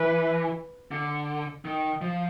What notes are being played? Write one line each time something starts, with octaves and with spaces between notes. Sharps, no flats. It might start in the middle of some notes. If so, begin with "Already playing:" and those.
Already playing: E3 B4
D3
D#3
F3